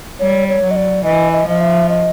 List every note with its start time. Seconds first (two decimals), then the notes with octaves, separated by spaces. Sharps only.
0.19 G3 C#5
0.48 C#5
0.62 F#3
0.71 D#5
0.76 D5
1.04 E3 D#5
1.32 D#5
1.46 F3 D#5
1.61 E5
1.89 D#5